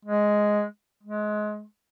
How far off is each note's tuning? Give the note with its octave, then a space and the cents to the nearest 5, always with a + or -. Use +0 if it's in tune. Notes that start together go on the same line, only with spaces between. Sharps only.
G#3 +0
G#3 +25